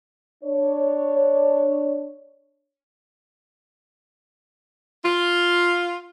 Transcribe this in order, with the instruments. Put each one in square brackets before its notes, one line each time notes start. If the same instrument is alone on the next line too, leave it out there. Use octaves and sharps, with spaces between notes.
[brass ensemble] D4 C#5
[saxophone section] F4